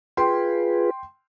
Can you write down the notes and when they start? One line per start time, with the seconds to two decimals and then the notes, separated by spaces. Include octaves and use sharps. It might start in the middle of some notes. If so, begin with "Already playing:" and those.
0.17 F4 G#4 B4 G5 C6